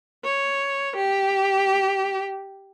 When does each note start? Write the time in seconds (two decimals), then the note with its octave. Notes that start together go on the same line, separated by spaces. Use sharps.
0.24 C#5
0.96 G4